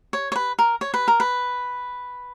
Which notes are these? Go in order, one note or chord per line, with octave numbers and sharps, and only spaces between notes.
C#5
C#5
B4
A#4
C#5
B4
A#4
B4